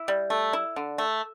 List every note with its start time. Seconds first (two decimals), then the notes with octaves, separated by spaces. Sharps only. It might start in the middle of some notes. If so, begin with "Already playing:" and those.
Already playing: E4
0.08 G3
0.30 A3
0.53 E4
0.76 D3
0.98 A3